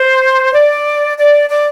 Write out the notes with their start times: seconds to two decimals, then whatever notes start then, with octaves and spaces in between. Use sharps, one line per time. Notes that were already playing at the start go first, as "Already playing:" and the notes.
Already playing: C5
0.53 D5
1.18 D5
1.50 D5